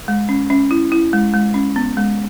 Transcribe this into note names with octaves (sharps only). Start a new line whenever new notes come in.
G#3
C#4
C#4
E4
E4
G#3
G#3
C#4
B3
G#3